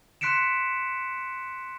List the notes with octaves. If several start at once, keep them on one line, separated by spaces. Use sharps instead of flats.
C6 F#6 B6 C#7 D7 E7